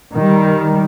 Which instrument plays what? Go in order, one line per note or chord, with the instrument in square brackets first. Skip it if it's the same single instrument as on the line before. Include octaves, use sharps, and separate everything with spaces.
[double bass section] D#3 G3